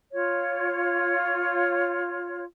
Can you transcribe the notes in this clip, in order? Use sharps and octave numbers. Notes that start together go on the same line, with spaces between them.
F4 C#5